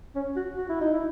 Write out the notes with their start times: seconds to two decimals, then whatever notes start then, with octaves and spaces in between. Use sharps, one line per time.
0.15 C#4
0.36 F#4
0.57 F#4
0.69 E4
0.81 D#4
0.93 E4